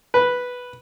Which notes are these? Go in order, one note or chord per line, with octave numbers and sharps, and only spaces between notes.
B4